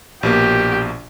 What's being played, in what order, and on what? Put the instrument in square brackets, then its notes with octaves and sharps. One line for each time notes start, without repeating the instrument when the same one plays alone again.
[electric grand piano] A#1 B2 A#3 [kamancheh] G4